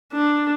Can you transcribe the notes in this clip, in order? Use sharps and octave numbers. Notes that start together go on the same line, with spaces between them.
D4